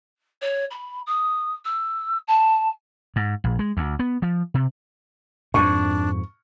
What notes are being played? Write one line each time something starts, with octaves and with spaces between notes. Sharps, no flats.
C#5
B5
D#6
E6
A5
G#2
A#1
G#3
D2
B3
F3
C3
F2 G#2 D4 C#6